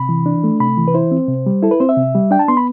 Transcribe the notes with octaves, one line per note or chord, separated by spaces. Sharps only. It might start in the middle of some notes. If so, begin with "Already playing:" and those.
Already playing: C3 B5
E3
D4
A3
C3 B5
E3
B4
E4 C5
C4
C3
G3
E4 A4
B4
C4 C5
E5
C3
G3
D4 G5
A5
B3 C6
B5